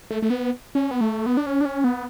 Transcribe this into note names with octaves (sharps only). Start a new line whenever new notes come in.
A3
A3
B3
C#4
B3
A3
B3
D4
C#4
D4
C#4
B3